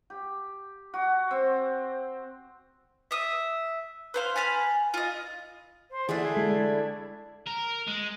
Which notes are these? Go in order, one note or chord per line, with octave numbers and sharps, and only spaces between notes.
G4
F#4
C4
E5 D#6
B4 C5 F5
G#5 A5 B5 F6
F4 D#5
C5
D3 E3 A3 D4 E4 G#4
G#3 C7
G#3
A#4
G#3